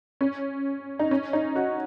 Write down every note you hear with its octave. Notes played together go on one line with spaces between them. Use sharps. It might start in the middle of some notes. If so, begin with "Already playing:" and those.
C#4
D#4
C#4
D#4
F#4